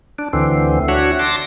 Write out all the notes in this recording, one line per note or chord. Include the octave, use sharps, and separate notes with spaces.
D4
D2 D3 E3 C4
D4 F#4 C#5 E5 F#5
A5 C6 D6 A#6